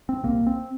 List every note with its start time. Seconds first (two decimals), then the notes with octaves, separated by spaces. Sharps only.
0.09 C4
0.23 C2 C3 A#3
0.47 C4